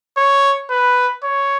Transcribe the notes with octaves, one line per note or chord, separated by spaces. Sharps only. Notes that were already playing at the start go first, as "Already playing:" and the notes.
C#5
B4
C#5